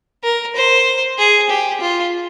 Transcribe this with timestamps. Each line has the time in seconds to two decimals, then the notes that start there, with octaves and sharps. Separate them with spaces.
0.24 A#4
0.56 C5
1.18 G#4
1.50 G4
1.81 F4